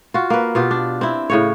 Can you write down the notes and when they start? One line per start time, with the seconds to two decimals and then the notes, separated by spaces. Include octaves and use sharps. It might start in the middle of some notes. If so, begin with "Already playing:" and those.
0.14 F4 F#4
0.30 A#3 B4
0.55 B2 F4 G4
0.71 D4
1.01 C4 E4
1.30 A2 C#3 C#5